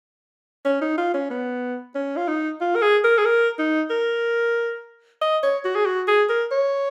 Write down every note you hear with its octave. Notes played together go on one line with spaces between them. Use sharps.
C#4
D#4
F4
C#4
B3
C#4
F4
D#4
F4
A#4
G#4
A#4
G#4
A#4
D#4
A#4
D#5
C#5
F#4
G#4
F#4
G#4
A#4
C#5